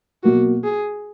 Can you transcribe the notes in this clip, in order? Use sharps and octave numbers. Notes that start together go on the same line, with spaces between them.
B2 F#3 A#3 F#4
G#4